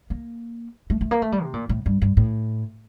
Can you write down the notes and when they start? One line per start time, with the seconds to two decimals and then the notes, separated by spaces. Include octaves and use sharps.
0.10 A#3
0.90 A3
1.01 A3
1.11 A#3
1.22 A3
1.32 G3
1.43 C3
1.54 A#2
1.69 A2
1.86 G2
2.02 G2
2.17 A2